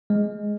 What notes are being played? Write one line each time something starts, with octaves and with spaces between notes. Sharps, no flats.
G#3